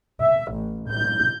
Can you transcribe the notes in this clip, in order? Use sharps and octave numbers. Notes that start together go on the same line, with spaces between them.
E5
A1
G6